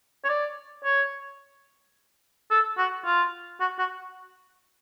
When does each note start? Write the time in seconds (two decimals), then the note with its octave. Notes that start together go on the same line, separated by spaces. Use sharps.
0.24 C#5
0.29 D5
0.84 C#5
2.51 A4
2.78 F#4
3.05 F4
3.60 F#4
3.79 F#4